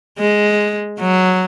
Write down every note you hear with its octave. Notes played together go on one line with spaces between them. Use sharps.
G#3
F#3